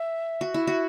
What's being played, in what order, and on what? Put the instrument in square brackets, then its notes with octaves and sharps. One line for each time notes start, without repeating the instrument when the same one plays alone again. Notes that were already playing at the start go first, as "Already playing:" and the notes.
Already playing: [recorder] E5
[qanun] F#4
E4
F#4